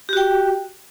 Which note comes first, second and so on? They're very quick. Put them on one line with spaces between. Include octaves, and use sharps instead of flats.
G4 F#4 G5